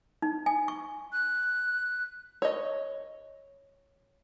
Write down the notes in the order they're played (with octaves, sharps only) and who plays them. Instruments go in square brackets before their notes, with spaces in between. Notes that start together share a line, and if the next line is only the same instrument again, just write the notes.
[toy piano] D#4
G#5
C#6
[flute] F#6
[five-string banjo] C#5 D#5